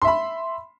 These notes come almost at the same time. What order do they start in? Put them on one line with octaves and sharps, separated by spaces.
C6 E5 B5